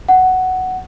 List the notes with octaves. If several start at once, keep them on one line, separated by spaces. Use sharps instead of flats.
F#5